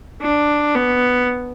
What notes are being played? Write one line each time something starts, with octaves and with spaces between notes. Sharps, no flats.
D4
B3